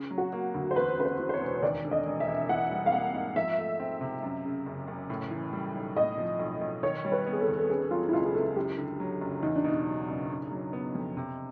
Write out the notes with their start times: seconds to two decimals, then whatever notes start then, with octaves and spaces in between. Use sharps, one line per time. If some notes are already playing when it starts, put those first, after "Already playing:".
Already playing: C#3
0.11 F#3
0.18 F#4
0.33 A#3
0.54 D2
0.71 C5
0.76 E2 B4
0.97 C#3 B4
1.05 C5
1.19 E3
1.29 C5
1.34 C#5
1.41 E1
1.63 D#2 D5
1.85 D3
1.91 D#5
2.06 E1
2.20 E5
2.28 E1
2.49 E3 F#5
2.71 G3
2.86 F5
2.92 A#3 F#5
3.14 G#2
3.36 F3 E5
3.58 A3
3.79 C4
4.01 C3
4.23 F#2
4.45 C#3
4.66 F#1
4.88 F#1
5.10 A2
5.31 E3
5.53 G3
5.75 B1
5.96 A2 D#5
6.18 F3
6.39 B1
6.61 B1
6.83 D#3 C#5
7.05 G3
7.12 B4
7.26 B3
7.32 G#4
7.41 A4
7.48 D#2
7.59 A4
7.69 C#3 G#4
7.91 F#3 F4
8.09 E4
8.13 C#2 F4
8.25 G#4
8.34 C#2 A4
8.56 F#2 G4
8.78 D3
9.00 F#3
9.21 F#1
9.43 E2 D#4
9.56 D4
9.64 B2 D#4
9.86 F#3
10.08 F#1
10.30 C#3
10.51 F#3
10.73 B3
10.95 F2
11.17 C3